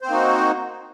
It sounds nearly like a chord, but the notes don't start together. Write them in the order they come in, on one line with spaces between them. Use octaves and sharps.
C5 C4 A#3 D#4 F#4